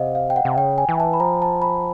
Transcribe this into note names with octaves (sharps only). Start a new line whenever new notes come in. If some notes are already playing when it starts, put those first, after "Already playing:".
Already playing: C3 D#5 F5 F#5
F5
G5
F#5
C3
C#3 G5
G#5
E3
A5
B5
F3 A#5
A5
B5